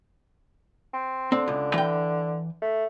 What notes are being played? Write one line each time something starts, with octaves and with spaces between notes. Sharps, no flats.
C4
D3 C4
C#2
E3 G5
A3